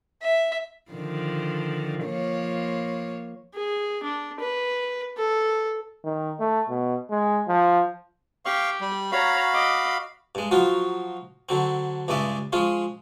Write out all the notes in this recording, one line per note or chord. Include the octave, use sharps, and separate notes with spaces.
E5
D3 D#3 F3
F3 A#3 C#5
G#4
D4
B4
A4
D#3
A3
B2
G#3
F3
G4 F5 C#6
G3
F#4 C#5 F5 A#5 B5
D#5 D6
G2 G#3
F3 F#3 D#4 F4 F#4
D3 F#3 C4
C#2 G2 C#3 G#3 D5 E5
F3 G#3 C#4 F4